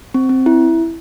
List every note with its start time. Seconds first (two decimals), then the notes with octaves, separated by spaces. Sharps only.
0.14 C4
0.29 C4
0.46 E4